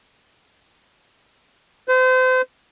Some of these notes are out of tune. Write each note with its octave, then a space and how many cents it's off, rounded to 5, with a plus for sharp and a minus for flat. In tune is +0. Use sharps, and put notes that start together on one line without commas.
C5 -35